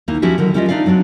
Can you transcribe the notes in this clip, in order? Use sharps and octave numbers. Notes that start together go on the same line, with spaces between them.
D#2 A#3 D#4 E4
F3 C#4 E4 F#4 G4 E5
D3 D#3 F#3
G3 C#4 E4 F4 D5 D#5
D4 D#4 F4 D5 E5 F5
F#3 C4 D4 F#4